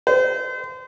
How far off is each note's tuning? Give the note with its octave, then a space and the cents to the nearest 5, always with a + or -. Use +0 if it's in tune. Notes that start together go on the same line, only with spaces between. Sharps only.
C5 -35